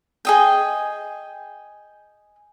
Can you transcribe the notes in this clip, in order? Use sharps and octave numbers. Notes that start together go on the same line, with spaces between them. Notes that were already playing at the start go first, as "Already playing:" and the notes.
G#4 D#5 G5